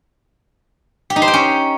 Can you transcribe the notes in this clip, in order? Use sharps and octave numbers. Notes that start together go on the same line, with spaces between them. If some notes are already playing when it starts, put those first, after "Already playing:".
G4
D#4
C5
G5
C#4